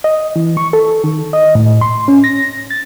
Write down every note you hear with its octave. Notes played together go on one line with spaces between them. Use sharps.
D#5
E3
C#6
A4
D#3
D#5
A2
C6
C#4
A#6
A6